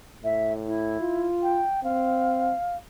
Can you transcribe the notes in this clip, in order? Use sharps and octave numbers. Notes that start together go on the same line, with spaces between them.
A2 E5
E4
F4
G5
C4 F5